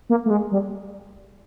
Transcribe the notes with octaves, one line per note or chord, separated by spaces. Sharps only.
A#3
A3
G#3
G3